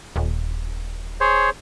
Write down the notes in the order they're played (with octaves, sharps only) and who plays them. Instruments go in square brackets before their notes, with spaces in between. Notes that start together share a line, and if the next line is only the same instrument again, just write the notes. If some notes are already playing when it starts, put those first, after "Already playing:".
[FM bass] D#1
[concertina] G#4 C5 C#5